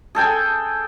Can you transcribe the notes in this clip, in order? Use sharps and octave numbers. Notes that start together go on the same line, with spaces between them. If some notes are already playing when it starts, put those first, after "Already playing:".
G#4 A4 G5 G#5